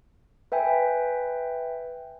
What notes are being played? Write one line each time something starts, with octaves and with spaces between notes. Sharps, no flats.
B4 E5 G5 G#5